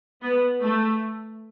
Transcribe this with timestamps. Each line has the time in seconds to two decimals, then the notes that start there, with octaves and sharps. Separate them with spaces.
0.21 B3
0.61 A3